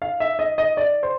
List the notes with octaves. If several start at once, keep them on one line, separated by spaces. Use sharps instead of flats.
F5
E5
D#5
D#5
D5
C5